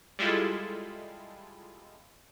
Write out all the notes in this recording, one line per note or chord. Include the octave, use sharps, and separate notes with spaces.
G3 G#3 E4 F4 A4